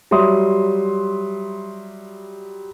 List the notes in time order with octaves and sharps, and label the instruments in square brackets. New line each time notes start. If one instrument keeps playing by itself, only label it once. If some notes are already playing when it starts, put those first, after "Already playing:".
[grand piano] F#3 G3 E5 C6 D#6